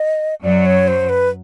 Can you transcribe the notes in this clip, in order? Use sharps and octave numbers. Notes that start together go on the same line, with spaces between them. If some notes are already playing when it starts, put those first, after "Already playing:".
Already playing: D#5
F#2 F#3 D5
C#5
C5
B4